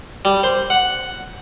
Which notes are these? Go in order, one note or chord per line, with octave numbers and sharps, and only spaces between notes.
G3
C5
F#5